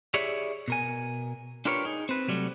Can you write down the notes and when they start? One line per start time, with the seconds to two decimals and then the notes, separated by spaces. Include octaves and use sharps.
0.14 E4 G4 G#4 C#5 D5 E5
0.68 B2 A#4 G#5
1.65 D4 F4 G4 A#4 B4 C#5
1.85 D#4 G#4
2.09 C4 B4
2.28 C3 F#3 G3 A3